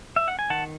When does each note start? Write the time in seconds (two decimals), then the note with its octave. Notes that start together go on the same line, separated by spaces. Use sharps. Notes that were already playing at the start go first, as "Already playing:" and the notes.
0.16 E5
0.28 F#5
0.39 G#5
0.50 D#3 F#5 A5